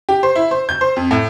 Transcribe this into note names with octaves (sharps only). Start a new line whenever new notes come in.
G4
C5
E4
C5
G6
C5
F2
A2